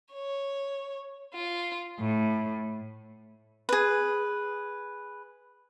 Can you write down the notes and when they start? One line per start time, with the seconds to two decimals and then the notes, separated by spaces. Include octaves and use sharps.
0.14 C#5
1.34 F4
2.00 A2
3.69 G#4 B4